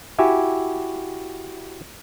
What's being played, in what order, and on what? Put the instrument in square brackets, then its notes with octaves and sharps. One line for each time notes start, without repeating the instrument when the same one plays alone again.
[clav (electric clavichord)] E4 F#4 G4 E5 G#5